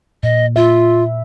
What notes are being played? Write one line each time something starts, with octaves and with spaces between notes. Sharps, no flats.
A#2 D#5
F4 E5